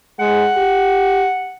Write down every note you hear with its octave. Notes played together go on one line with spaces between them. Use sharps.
G#3 F#5
G4